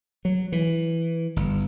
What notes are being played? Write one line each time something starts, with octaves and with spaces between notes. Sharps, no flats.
F#3
E3
G1